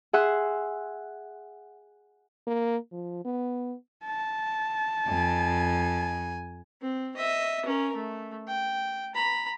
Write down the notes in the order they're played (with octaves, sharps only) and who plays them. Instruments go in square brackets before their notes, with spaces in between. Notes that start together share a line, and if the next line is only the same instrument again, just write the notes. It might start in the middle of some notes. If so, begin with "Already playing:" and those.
[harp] G#4 E5 F#5 C6
[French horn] A#3
F3
B3
[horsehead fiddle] A5
[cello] F2 [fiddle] G#5
[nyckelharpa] C4
D#5 E5
C#4 A#4
A3
G5
A#5 B5